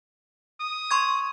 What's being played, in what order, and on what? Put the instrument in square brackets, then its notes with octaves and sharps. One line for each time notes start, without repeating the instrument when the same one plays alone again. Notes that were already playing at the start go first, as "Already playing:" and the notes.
[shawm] D#6
[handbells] C6 C#6 G#6